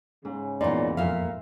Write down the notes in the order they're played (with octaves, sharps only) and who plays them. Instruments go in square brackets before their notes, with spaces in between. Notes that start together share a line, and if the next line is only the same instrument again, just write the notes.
[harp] G#2 [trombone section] C#3
[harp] E2 C6 [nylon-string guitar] A#2 D#4 [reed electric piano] D5
[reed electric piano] F2 [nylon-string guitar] A#2 F5 [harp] E5 F6